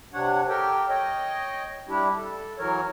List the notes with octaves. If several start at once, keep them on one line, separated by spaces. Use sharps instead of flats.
C3 D4 C#5 F#5
G4 A4 A#4 G5
C#5 D#5 G5
G3 D4 E4 G4
A4
E3 F#3 A#4 C#5